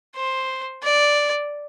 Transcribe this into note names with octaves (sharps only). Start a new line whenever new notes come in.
C5
D5